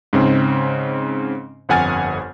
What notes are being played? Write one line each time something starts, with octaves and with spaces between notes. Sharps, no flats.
G#2 C#3 C4
G1 F2 F#5 G#5 F6 A6